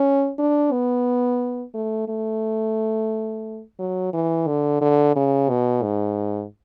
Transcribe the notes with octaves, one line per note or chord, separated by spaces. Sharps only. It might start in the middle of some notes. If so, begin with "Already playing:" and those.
Already playing: C#4
D4
B3
A3
A3
F#3
E3
D3
D3
C#3
B2
G#2